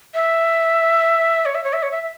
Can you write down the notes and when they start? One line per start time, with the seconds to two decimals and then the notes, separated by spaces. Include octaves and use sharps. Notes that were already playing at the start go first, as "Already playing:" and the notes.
0.15 E5
1.46 C#5
1.55 E5
1.64 C#5
1.73 E5
1.83 C#5
1.91 E5
2.02 E5